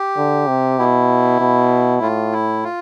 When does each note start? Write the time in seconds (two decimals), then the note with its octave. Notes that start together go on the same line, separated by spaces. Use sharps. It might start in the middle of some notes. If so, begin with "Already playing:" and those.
Already playing: G4
0.17 D3
0.48 C3
0.79 B2 E4
1.40 B2
2.02 A2 F4
2.32 E4
2.64 F4